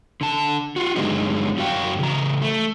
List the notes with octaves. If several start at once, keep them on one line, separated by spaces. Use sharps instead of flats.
D3 A5
F4 F#4
G2 D3 F#3 G#3 B3 D#4
F#2 F#3 F#4 F5 G5
C#3 E3 A#5
A3